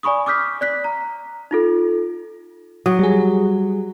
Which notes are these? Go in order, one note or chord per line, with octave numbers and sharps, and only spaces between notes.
D5 G#5 B5 C#6 D#6
D6 D#6 F6 G6 B6
D5 F#6 B6
A#5
D#4 F4 A4
F#3 D#6
G3 G#4